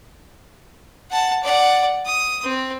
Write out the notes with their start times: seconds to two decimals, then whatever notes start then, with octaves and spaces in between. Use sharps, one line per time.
1.11 F#5 A5
1.43 D5 F#5
2.06 D#6
2.43 C4